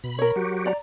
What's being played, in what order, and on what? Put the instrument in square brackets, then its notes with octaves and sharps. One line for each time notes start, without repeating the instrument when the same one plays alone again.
[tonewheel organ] B2 B5
[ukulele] A#4 C#5
[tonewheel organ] F#3 F#4 G4
[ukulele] D5 A#5